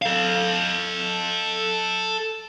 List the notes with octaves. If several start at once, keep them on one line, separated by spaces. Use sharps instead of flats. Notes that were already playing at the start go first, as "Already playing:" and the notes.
A4 F5